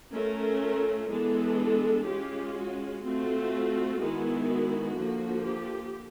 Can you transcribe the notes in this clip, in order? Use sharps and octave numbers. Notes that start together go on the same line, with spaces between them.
A3 C#4 F4 A#4
E3 G#3 B3 D4 A4
G#3 C#4 F4 G4
F#4
A3 C4 F4 F#4
D#3 G#3 B3 E4
F#4
D3 F3 A#3
G4